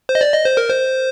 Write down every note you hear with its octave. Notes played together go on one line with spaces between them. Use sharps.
C5
D#5
D5
D#5
C5
A#4
C5